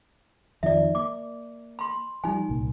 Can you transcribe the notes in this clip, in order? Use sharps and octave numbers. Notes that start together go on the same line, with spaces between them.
F2 D#3 F3 D5 E5
A#3 D6
B5 C6
F3 G3 D#4 G#5
C2 A#2